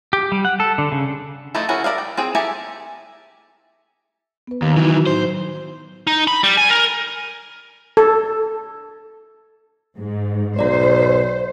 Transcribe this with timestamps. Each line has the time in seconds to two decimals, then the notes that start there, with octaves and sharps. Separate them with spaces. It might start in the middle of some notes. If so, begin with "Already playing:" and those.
0.13 G4
0.32 G3
0.45 F#5
0.60 A4
0.78 D3
0.92 C#3
1.55 F3 A3 D#4 E4 A4
1.69 C#4 E4 F#4 G#4 A#4
1.84 A#4 D5 E5 F5
1.98 G5
2.17 C4 G#4 G5
2.35 G4 A4 E5 G#5 A#5
4.47 B3 B4
4.62 D#2 D#3 B3
4.76 D#3 E3 F#3 D#4 F#4
4.92 F#3 F#4
5.06 A2 F#3 D#4 C5
6.07 D#4
6.27 B5
6.43 G3
6.57 G#5
6.70 A#4
7.97 A4
9.98 G#2
10.59 B1 C5 D5 A#5